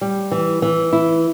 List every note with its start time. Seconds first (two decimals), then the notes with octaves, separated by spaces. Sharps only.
0.01 G3
0.31 E3
0.62 E3
0.93 E4